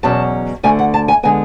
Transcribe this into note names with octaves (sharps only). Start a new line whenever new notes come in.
E2 B2 F#3 C#4 A5
D2 D3 A3 G#5
F#5
A5
G#5
D3 G#3 B3 G#5